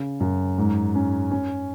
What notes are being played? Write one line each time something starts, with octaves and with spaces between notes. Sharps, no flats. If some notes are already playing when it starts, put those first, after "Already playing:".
Already playing: C#3
F#2
G#2
C#4
C#4